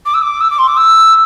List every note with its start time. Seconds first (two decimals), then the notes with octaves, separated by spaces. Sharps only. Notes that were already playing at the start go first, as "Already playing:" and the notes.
0.06 D6
0.14 E6
0.22 D6
0.41 E6
0.51 D6
0.59 C6
0.68 D6
0.77 E6